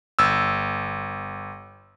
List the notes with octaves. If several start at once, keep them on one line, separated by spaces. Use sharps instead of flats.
G1 E6